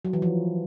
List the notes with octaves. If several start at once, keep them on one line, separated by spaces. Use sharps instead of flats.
F#3
E3
F3